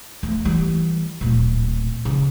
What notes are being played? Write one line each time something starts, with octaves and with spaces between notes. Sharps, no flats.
D2
E3 G3
D1 A#2
C#3